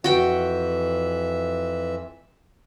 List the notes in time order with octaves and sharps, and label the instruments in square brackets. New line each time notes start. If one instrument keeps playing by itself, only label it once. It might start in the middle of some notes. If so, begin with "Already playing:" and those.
[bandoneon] F2 E3 E5 [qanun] F#4 G5